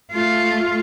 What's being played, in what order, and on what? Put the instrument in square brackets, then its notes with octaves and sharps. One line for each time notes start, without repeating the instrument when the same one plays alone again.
[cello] A3 F4